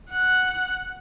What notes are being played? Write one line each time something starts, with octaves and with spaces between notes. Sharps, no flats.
F#5 F#6